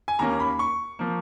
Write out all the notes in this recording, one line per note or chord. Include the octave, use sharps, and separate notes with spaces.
G#5
D#2 D#3 A#3 C#4 A#5
B5
C#6
F3 A#3